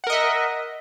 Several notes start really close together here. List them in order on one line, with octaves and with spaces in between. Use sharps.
F#5 A#4 D#5 E5